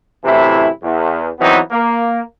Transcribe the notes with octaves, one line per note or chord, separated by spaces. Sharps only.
F#2 A2 C3 E3 E4
E2
E2 E3 F#3 B3 C4 D#4
A#3